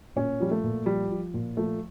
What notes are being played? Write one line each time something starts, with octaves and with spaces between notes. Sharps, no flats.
A#2 C#4
F3 G3
A3
A#2
F3 G3
F3
A#2
F3 A3